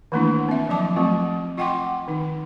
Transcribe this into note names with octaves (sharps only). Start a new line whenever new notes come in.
D#3 E3 A3 A#3 D4 E4
C4 E5
F3 F#3 A5 D6
F#3 A3 C4 F4
F4 D#5 F#5 G5 C6 D6
D#3 D#4